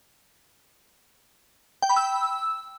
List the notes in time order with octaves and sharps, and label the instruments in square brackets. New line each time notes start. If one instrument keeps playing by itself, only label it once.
[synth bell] G5
B5
E6